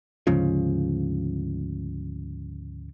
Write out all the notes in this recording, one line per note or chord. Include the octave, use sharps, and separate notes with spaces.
D2 G#2 C#3 F3